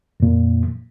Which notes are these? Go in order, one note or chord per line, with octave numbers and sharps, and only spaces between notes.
F2 A#2